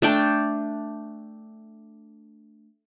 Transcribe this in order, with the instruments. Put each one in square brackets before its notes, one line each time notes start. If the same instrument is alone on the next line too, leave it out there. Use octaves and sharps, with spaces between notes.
[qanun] A3 D4 G5 A5